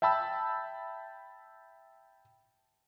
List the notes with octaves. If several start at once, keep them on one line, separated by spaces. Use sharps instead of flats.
E5 G5 A5 B5 E6